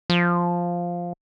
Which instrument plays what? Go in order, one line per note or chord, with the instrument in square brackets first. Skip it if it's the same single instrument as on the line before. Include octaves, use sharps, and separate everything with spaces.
[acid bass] F3